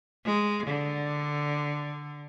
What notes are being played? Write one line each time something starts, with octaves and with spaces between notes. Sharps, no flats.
G#3
D3